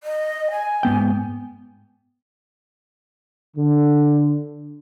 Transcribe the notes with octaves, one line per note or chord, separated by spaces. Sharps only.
D#5
G#5
G#2 B3 G5
D3